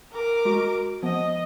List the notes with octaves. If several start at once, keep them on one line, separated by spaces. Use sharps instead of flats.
A#4 D6
G#3 F#4
F3 B3 D#5